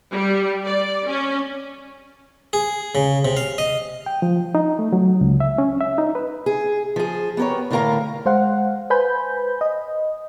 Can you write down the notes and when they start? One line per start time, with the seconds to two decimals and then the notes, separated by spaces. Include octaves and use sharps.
0.11 G3
0.65 D5
1.07 C#4
2.53 G#4
2.95 C#3
3.25 C3
3.37 F5
3.58 D#5
4.06 G5
4.22 F3
4.55 D#4
4.79 A3
4.93 F#3
5.21 C#2
5.40 E5
5.58 C#4
5.81 E5
5.98 D#4
6.15 B4
6.46 G#4
6.96 F3 G#4
7.37 B3 G4 G#4 A#4 C#5
7.71 A2 D3 B3 A#4 F5 A#5
8.26 G#3 C5 F5 F#5
8.90 B4 C5 G#5 B5 G6
9.61 D#5